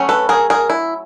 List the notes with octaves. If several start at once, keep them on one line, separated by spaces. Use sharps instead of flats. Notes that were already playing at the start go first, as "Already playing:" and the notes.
Already playing: F#3 A3 C#4
A4 B4
G#4 A#4
G#4 A#4
E4